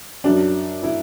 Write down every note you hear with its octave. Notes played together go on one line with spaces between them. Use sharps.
F#2 F#3 D4
E4